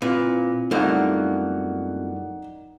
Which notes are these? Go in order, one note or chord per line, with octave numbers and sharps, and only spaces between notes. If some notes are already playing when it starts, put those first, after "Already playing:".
A#2 C4 E4 F4 B4
F#2 G3 A3 A#3 D#4 D5 F#5